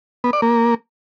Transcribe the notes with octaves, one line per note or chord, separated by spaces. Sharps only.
B3
D5
A#3